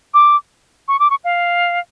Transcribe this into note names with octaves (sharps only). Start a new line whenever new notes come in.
D6
C#6
D6
C#6
F5